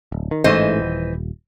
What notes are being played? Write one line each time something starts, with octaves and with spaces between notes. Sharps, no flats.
D1
D#3
A1 G#2 E3 A3 C5 D#5
D#1